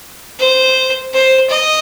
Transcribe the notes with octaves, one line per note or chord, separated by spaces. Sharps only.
C5
C5
D#5